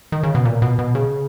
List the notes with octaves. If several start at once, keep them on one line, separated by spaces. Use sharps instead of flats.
D#3
C#3
B2
A#2
B2
B2
C#3